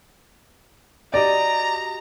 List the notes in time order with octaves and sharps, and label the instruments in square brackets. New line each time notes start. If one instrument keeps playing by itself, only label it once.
[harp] F#4 G4 D#5 [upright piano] D5 [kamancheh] A#5